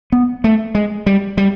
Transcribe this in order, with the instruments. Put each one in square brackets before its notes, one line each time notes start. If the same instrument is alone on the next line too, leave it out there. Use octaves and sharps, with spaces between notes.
[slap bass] B3
A3
G#3
G3
G3